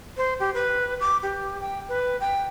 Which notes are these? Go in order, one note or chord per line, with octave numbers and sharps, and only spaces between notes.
C5
G4
B4
D6
G4
G5
B4
G5